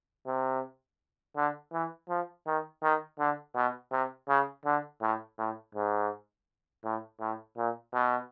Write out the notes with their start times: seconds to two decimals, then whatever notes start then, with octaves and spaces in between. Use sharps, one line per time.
0.27 C3
1.37 D3
1.73 E3
2.10 F3
2.47 D#3
2.83 D#3
3.19 D3
3.56 B2
3.92 C3
4.29 C#3
4.66 D3
5.02 A2
5.39 A2
5.75 G#2
6.85 A2
7.21 A2
7.58 A#2
7.94 B2